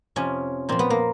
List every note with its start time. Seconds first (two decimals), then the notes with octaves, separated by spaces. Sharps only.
0.16 F2 C3 F3 C#4
0.69 A#2 F3 C4
0.79 B3
0.90 A#3